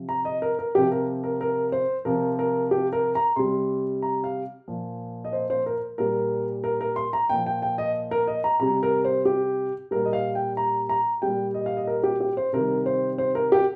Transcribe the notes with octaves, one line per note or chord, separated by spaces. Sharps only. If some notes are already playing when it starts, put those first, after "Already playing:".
Already playing: C3 F3
A#5
D#5
A#4
A#4
C3 F3 G4
A#4
A#4
A#4
C5
C3 F3 A#4
A#4
G4
A#4
A#5
C3 G3 C6
A#5
F5
A#2 F3
D#5
C5
C5
A#4
A#2 G3 A#4
A#4
A#4
C6
A#5
A#2 F3 G5
G5
G5
D#5
A#4
D#5
A#5
C3 G3 A#5
A#4
C5
G4
A#2 G3 A#4
D#5
F5
G5
A#5
A#5
A#2 G3 G5
D#5
F5
D#5
A#4
G4
G4
C5
C3 D#3 G3 A#4
C5
C5
A#4
G4